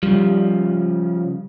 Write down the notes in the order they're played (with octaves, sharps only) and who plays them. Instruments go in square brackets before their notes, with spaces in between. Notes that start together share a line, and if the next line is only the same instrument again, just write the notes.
[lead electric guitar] C#3 F3 [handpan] G3